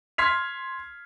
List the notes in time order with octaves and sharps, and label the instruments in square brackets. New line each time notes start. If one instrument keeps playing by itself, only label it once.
[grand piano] C6 F6 G#6 B6 C7 F7